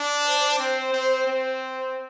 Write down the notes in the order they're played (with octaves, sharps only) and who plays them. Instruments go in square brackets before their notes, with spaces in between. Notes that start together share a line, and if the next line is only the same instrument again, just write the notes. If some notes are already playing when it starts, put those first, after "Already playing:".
Already playing: [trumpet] D4
[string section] C5
[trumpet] C4
C4
C4